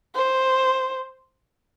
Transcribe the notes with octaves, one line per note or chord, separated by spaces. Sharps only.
C5